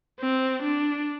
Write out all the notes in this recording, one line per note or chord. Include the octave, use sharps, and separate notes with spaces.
C4
D4